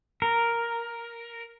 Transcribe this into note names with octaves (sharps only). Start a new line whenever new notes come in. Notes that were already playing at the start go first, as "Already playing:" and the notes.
A#4